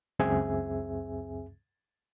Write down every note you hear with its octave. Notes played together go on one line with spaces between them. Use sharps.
C#2 F#2 C4 G#4 E5 G#5